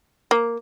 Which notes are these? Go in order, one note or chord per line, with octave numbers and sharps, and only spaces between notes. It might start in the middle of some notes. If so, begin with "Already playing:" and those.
A#3